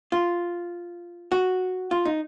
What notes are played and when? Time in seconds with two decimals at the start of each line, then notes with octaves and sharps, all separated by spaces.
0.12 F4
1.32 F#4
1.91 F4
2.05 D#4